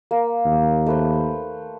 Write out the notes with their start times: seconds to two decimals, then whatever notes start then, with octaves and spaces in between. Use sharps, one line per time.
0.11 A#3
0.45 D#2
0.86 A3 B4 C5